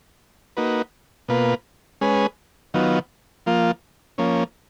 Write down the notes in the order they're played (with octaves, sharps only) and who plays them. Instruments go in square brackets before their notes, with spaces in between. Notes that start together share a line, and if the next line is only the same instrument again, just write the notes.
[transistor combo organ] A#3 D#4 F#4 B4
B2 A#3 F4 B4
G#3 C#4 G#4 B4
D#3 F#3 B3 F4
F3 A#3 F4
F3 A#3 C#4